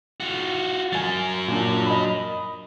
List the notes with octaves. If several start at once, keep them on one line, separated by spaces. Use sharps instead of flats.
F4 F#4
F#3 A#4 G#5 A6
A#2 D4
D#5 B5